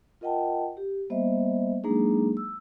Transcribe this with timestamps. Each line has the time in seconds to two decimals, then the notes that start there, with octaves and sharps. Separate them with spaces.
0.21 F4 A#4 D#5 F#5 G5 A5
0.77 G4
1.10 G3 A#3 B3 C5 D#5 E5
1.84 F#3 G#3 A#3 D4 D#4 G#4
2.37 E6